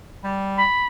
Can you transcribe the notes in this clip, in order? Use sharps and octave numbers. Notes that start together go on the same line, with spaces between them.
G3
B5